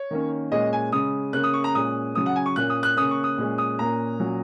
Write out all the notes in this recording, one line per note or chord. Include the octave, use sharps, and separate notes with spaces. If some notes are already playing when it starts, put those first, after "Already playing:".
Already playing: C#5
D#3 A#3 C#4
A#2 G#3 C#4 D#5
G#5
C#3 G#3 C#4 D#6
C#3 A#3 C#4 F#6
D#6
C#6
A#5
A#2 G#3 C#4 D#6
C#3 F#3 C#4 D#6
F#5
G#5
C#6
A#2 A#3 C#4 F#6
D#6
F#6
C#3 A#3 C#4 D#6
C#6
D#6
A#2 G#3 C#4
D#6
A#2 A#3 C#4 A#5
A#2 F#3 C#4